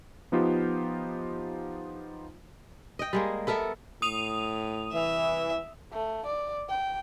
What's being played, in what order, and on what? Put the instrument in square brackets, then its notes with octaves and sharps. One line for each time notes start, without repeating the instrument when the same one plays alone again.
[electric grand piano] F3 B3 D#4 F4 G4 C5
[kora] D#5 G5
G3 G#3 A#3
B3 A4 A#4 E5
[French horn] A2 [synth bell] D#6 D#7 F7
[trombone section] C2 E3 [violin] E5
[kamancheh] A3
D5
G5